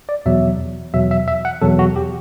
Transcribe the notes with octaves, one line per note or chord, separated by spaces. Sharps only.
D5
E2 B2 F#3 E5
E2 B2 F#3 E5
E5
E5
F#5
E2 B2 F#3 A4
F#4
G4